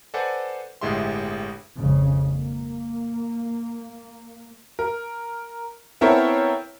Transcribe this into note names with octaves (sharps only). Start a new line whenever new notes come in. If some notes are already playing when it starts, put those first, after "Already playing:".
A4 B4 C5 D5 F#5 G#5
G1 A2 G#3 G4 E5 C6
G#1 F2 C#3
A#3
A#4
B3 C4 E4 A4 A#4 C#5